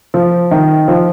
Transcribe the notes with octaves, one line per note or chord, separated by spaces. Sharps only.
F3
D#3
F3